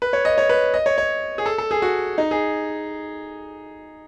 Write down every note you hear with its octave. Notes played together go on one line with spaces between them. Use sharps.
B4
C#5
D#5
C#5
B4
D#5
C#5
C#5
G#4
A4
A4
G#4
F#4
D#4
G#4